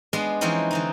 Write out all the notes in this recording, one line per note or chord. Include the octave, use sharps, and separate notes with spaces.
G#3 B3 D4 C6
E3 F3 G#3 C4 C#4 D#4
D3 E3 D#4